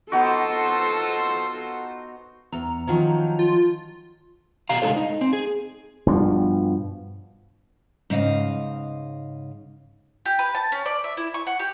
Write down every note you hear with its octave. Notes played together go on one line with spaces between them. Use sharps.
B3 D#4 F4 F#4 A4 C5
E2 A#5
D#3 F3 F#3
F4
B2 G4 F5 A#5
C#3 G#3 D4 D#4 A4 C5
D#4
C4
G#4
G2 B2 F3
G#2 C#3 D#5 F5
G4
B4
A5
C#4
D5
E5
E4
C#6
F#5
G4